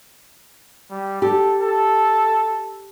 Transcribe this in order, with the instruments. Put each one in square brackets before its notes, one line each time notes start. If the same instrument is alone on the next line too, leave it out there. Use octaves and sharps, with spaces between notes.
[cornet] G3
[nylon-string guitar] G4 [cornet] A4
[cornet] A4